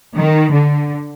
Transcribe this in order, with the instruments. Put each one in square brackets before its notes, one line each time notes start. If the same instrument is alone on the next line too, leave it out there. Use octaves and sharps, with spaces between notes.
[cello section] D#3
D3